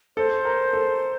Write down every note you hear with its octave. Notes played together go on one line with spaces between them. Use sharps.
A4 C5
A#4
A4